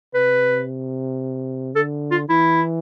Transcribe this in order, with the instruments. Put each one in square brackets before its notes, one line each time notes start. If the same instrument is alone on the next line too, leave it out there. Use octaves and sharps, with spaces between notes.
[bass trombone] C3 [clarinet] B4
[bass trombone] D3 [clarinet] A4
[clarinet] F4
[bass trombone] E3 [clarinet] E4